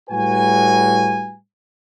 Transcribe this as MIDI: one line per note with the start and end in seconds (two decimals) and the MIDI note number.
0.10 1.35 45
0.10 1.35 55
0.10 1.35 66
0.10 1.35 71
0.10 1.35 80